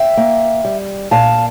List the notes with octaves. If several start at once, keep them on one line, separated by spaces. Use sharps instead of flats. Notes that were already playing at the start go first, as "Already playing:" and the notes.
Already playing: E5 G5
A#3
G3
A#2 F5 A5